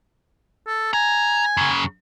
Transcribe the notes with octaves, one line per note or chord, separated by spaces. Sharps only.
A4
G#5 A#5
F#2 C#3